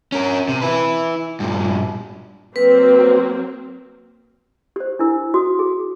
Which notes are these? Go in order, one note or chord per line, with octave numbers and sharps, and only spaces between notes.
C#4 A#4
C3
E4 B4
G2 A#2
F#3 A#3 C4 B4
G4 C5
D4 E4 A#4
F#4 D#6
G#4